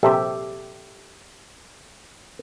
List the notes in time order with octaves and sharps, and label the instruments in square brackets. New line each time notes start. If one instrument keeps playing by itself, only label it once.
[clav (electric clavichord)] A#1 C3 [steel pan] G4 A4 E5